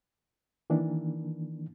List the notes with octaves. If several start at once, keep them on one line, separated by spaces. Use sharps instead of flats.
D#3 E3 A#3 D4